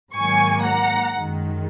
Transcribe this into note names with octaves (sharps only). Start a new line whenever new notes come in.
G#2 D#3 F#3 A#3 G#5 C#6
F#5 A#5
F#2 D#3 G#3